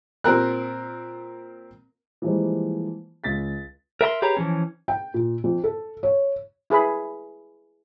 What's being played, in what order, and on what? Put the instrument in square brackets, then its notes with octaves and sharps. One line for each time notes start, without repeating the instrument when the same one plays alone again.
[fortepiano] A#2 C4 A#4 F#6
[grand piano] E3 F3 G3 G#3 A#3 C5
C#2 A6 B6
[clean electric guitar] A#4 E5 A#5 C6
G4 G#4 B4 C#5 A#5
E3 F3 C#4
[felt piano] G5
A#2
F2
A4
C#5
[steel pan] E4 G#4 B4 B5